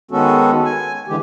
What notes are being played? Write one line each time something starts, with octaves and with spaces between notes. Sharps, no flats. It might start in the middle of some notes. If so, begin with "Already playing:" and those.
D#3 G#3 B3 C#4 F#4 A4
G#5
D3 E3 G#3 G4